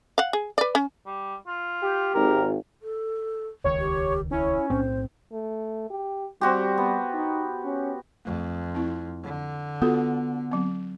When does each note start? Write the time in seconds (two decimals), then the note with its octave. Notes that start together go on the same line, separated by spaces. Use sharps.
0.18 F5 F#5
0.33 G#4
0.58 B4 D5
0.75 C#4
1.07 G3
1.48 F4
1.82 G4
2.14 G#1 A#4
2.82 A4
3.64 D#1 C#2 D#3 C#5
3.80 G4
4.31 C#4 E4
4.70 B1 A2 C4 C5
5.32 A3
5.90 G4
6.41 G3 C4 F#4 G4
6.78 B3
7.14 D#4
7.65 C#4
8.25 F2 A3
8.75 C4 E4
9.23 D3
9.82 B3 F4 F#4 A4
10.51 F#3 C4